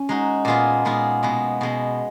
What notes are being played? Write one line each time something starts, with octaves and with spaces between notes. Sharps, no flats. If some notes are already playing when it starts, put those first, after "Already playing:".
Already playing: C#4
G#3 D#4 F#4
A#2 G#3 B3 F4 G#4
A#2 G#3 B3 F4 G#4
B2 G#3 B3
B2 G#3 B3